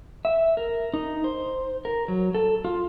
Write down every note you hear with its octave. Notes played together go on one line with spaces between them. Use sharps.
E5
A#4
D#4
C5
A#4
F#3
A4
F4